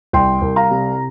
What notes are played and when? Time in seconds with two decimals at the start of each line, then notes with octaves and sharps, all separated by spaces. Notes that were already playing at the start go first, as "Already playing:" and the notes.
0.13 C2 G5 C6
0.42 C2
0.56 F5 A#5
0.71 C3